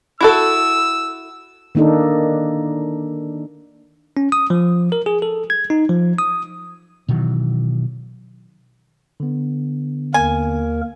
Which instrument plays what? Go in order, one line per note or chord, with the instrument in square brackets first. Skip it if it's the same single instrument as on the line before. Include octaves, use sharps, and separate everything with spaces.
[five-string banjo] E4 F#4 A4 [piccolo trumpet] E6
[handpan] D#3 A#3 D4 D#4 A4
[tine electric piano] C#4
D#6
F3
A#4
G#4
A4
G#6
D#4
F3
D#6
[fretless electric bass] B2 D#3 E3 F#3
[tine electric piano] D3 B3
[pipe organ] D#2 A#3 A#4 [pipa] G#5